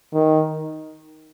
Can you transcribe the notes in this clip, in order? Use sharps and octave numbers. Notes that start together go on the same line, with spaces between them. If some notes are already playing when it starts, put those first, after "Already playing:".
D#3